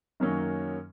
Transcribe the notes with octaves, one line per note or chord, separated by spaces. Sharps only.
F#2 D#3 F#3 A#3 C#4